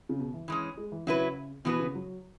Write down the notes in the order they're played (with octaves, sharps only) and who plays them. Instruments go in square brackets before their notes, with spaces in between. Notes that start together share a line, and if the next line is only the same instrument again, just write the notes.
[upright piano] C#3
B2
E3
[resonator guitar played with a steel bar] E3 G#3 C#4
[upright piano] G#3
E3
[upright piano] C#3 [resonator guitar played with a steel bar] F#3 E4 B4
[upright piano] B2 [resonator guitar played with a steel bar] E3 B3 F#4 B4
[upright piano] C#3
F#3